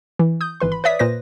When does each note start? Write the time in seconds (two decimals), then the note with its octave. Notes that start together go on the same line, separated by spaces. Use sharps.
0.19 E3
0.41 D#6 G6
0.60 G#1 E3 B4 C6
0.72 B5
0.84 B4 C#5 D5 E5 D#6 B6
0.99 A#2 B4 C5 A#6